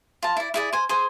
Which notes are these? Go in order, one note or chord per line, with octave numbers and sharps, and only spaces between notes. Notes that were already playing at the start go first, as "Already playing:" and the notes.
F4 A5
E4 D5
E4 G#4 D5
C5 G#5
G#4 C5 G#5